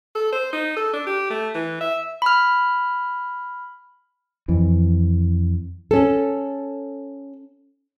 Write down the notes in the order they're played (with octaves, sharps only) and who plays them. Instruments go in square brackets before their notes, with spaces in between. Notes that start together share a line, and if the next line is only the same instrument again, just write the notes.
[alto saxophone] A4
C5
D#4
A4
D4
G4
A3
E3
E5
[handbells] B5 F6
[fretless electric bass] F2 E3
[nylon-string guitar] C#4 A4